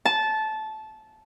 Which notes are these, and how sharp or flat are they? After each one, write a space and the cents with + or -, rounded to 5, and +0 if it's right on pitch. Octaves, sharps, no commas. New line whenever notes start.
A5 -15